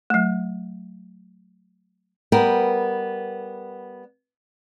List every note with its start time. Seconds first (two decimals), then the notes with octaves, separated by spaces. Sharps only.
0.10 F#3 A3
2.32 G3 B3 A#4 G5